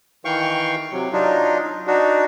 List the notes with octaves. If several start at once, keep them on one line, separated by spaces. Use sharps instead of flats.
D#3 E3 F5 G5 C#6
C3 F#3
F#3 D4 D#4 F4
D4 D#4 F#4